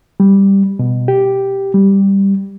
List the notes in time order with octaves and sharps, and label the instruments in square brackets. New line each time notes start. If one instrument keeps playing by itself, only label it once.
[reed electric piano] G3
B2
G4
G3